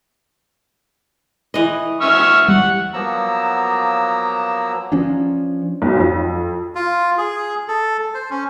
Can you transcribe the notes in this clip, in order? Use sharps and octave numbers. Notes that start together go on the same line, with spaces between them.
E3 D#5
E5 C#6 F6
G3 F#5
F3 F#3 A#3 B3 A#5 E6
F3 C#4 D4
B1
F2
F4
G#4
A4
C5
C#4